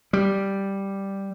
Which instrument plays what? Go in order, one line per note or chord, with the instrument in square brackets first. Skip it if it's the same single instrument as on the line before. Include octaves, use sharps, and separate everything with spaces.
[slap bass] G3